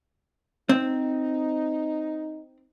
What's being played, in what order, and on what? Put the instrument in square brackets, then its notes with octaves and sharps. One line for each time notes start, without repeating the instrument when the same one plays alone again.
[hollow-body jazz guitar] C4 [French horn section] D#4